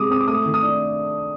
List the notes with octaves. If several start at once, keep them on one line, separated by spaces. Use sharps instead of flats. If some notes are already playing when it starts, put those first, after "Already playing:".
Already playing: C3 G#3 D6 D#6
C4 D#6
D6
A3 D#6
D#3
D#6
D4